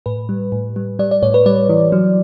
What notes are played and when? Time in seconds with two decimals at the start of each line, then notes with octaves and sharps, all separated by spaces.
0.06 A2 B4
0.29 G3
0.52 A2
0.76 G3
0.99 G3 D5
1.11 D5
1.22 A2 C#5
1.34 B4
1.46 G3 D5
1.69 E3
1.92 F#3